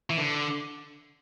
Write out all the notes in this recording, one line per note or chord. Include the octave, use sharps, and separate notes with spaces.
E3
D3